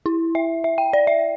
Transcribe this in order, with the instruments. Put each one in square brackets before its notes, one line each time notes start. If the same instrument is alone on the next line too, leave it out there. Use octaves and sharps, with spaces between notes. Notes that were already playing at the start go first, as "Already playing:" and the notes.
[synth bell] E4
E5
E5
G5
D5
E5